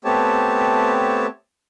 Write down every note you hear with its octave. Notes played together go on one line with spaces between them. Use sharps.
A3 B3 C4 G4 C#5 A5